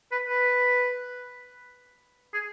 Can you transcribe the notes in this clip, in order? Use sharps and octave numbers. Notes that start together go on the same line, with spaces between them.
B4
B4
G#4